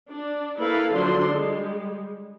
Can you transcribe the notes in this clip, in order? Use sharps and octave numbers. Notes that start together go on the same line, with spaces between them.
D4
A#3 E4 A4 B4 F5
D3 F3 F#3 D4 C6
G3 G#3